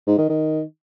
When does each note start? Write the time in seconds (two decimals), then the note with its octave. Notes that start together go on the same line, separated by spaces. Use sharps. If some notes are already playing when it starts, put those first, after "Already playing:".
0.07 G#2
0.18 D#3
0.29 D#3